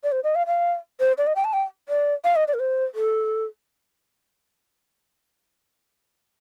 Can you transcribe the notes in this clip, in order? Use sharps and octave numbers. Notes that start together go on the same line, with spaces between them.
D5
C5
D#5
F5
F5
C5
D5
D#5
G5
A5
G5
D5
F5
D#5
D5
A#4
C5
A4